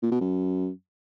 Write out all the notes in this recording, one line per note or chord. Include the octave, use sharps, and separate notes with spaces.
A#2
B2
F#2